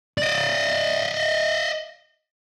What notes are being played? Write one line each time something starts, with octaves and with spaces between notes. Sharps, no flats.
D5 D#5